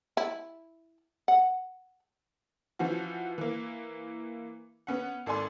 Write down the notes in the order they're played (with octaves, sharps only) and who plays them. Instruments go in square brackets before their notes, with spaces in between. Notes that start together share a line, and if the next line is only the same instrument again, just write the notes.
[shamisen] E4
F#5
[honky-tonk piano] E3 F3 C#4 F#4
E3 A#3
B3 C#4 F#5
G#1 A4 D5 G#5 C6